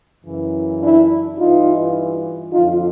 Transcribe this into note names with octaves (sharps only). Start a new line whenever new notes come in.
F#2 C#3 E3
D4 E4
G2 E3 D#4 F4
F2 D3 F3 D#4 F4